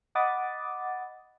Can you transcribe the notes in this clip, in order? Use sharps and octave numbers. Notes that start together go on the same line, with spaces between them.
D#5 F#5 B5 D6 D#6 A6